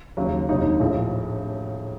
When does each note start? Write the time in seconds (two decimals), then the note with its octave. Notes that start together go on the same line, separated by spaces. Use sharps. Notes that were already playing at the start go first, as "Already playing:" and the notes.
0.17 D#2 C#3 F#3
0.49 F1 D#2 D3 F#3 D#4
0.80 A#1 A2 F3